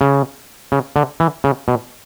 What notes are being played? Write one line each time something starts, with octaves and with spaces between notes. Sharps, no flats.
C#3
C#3
D3
E3
C#3
B2